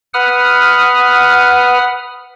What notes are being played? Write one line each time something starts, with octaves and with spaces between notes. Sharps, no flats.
B4 F#5 D#6 F6